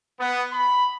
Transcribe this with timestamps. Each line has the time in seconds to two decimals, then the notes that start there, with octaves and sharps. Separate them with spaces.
0.19 B3
0.52 B5